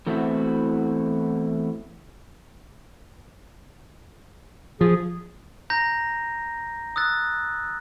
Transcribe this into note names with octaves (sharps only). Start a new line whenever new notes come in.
E3 A3 B3 C4 E4 F#4
F3 G#4
A#5 G6 A#6
D#6 E6 F#6 A6